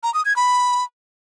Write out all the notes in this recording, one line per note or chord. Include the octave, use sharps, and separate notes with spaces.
A#5
D#6
G#6
B5